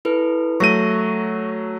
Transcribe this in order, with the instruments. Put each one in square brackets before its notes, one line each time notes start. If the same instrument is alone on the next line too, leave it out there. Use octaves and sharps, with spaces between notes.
[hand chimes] E4 A4 B4
[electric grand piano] F#3 A3 D#7 [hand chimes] C#6 A#6